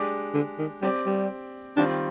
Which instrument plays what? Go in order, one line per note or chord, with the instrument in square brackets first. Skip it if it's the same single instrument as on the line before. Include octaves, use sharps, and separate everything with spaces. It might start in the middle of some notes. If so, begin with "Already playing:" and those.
Already playing: [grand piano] G#3 D4 G4 D5
[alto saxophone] D3
D#3
[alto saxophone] G3 [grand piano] C4 G4 D5
[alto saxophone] G3
[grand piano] D#3 G3 C4 F4 [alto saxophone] D4